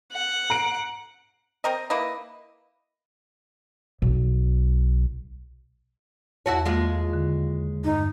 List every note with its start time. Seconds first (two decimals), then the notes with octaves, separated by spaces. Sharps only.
0.13 F#5
0.50 A#5 C7 D7
1.64 C4 A#4 D#5
1.90 A#3 E4 B4 D#5
4.02 B1
6.46 E2 E4 F#4 C#5 A5
6.65 D#2 G#3 F4
7.13 D3
7.84 G2 D#4